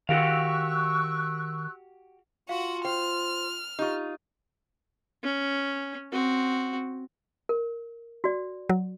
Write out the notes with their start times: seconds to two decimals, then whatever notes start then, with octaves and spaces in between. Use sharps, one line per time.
0.09 D#3 F#4 G4 F5 C#6 E6 F#6
2.49 F4 F#4 F5 F#5
2.85 C5 G5 F6
3.79 D#4 F4 G4 C#6
5.24 C#4
6.12 C4 F#4
7.49 A#4
8.24 F#4 D5
8.69 F#3